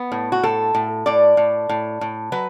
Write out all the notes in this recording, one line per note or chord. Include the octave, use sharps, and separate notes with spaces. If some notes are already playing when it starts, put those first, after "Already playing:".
Already playing: B3
A2
F#4
A2 A4
A2
A2 D5
A2
A2
A2
F#3 B4